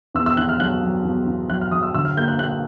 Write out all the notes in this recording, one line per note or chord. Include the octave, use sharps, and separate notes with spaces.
E2 E6
E6
E2 F#6
F6
F#3 F#6
F#3
E2
E2
F#3 F#6
F6
F#3 D#6
E6
D3 E6
F6
A#3 G6
F#6
A#3 F#6